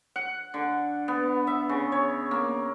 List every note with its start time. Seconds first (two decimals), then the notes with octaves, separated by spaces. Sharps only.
0.16 F#5
0.54 D3
1.08 B3
1.47 E5
1.69 C#3
1.92 C#5
2.31 A#3